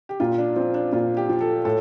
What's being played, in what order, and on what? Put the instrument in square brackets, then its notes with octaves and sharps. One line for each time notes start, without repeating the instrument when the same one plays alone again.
[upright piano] G4
A#2 F4
D4
F3 C4
D4
A#2 F4
G4
F3
A4
A2 A4